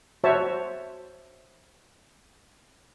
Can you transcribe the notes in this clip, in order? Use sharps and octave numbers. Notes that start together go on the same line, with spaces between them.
F#4 C5 C#5 E5 A5